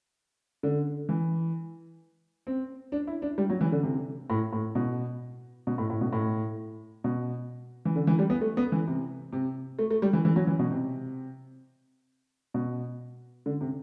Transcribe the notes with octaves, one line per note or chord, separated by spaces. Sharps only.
D3
E3
C4
D4
E4
D4
G3
F#3
E3
D3
C3
A2
A2
B2
B2
A2
A2
B2
A2
B2
E3
D3
E3
G3
B3
A3
B3
E3
C3
C3
A3
A3
G3
E3
E3
F#3
E3
B2
C3
B2
D3
C3